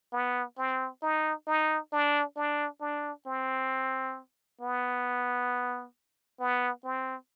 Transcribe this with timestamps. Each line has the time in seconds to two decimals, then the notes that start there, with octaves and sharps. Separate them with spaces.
0.12 B3
0.58 C4
1.02 D#4
1.47 D#4
1.92 D4
2.36 D4
2.81 D4
3.26 C4
4.61 B3
6.40 B3
6.84 C4